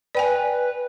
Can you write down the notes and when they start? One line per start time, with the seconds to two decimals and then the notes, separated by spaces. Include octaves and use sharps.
0.15 B4 D5 G5 G#5